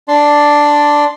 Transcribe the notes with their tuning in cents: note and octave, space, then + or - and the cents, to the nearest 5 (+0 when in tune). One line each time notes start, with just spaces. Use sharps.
D4 +0 D5 +0 C6 +0